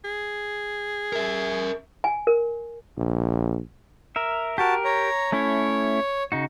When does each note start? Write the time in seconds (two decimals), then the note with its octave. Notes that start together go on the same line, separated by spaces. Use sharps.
0.05 G#4
1.13 A#4 E5
2.04 G#5
2.27 A#4
2.97 A#1
4.16 A#4 E5
4.58 F#4 G4 A#4 A5
4.84 C#5 A#5
5.32 A3 C#4 E4 C#5
6.32 C#3 D#4 F#4